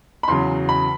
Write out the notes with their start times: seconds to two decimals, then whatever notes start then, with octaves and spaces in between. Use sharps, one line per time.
0.23 B5
0.28 E2 C#3 F#3 C6
0.69 B5